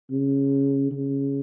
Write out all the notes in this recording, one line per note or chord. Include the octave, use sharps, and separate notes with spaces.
C#3
C#3